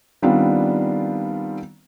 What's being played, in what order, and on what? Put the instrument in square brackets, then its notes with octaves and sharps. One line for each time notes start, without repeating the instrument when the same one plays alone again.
[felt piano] D#3 G3 B3 C4 D4 F4